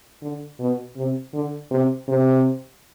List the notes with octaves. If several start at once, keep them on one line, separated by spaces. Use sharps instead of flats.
D3
B2
C3
D3
C3
C3